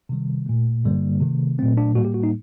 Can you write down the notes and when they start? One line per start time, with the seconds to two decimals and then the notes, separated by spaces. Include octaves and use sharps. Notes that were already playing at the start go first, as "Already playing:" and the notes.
0.09 C3 D#3 G3
0.46 A#2 A3
0.84 G2 D3 G3 A#3
1.21 C3 D#3 A3
1.59 A#2 F#3 A3 C4
1.77 D4
1.95 A2 G3 A#3 F#4
2.05 G4
2.14 F#4
2.23 D#4